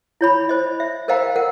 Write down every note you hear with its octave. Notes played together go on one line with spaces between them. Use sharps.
E4 C#5 B5
C5 D#5
E5
A#4 C5 D#5 F5 G5 A#5
A#4 F#5